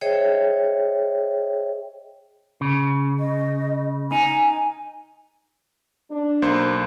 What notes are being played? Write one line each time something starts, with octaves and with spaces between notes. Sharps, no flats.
G#4 C5 C#5 D#5 E5 G5
C#3
D#5
D#4 G#5
D4
B1 A#3 C5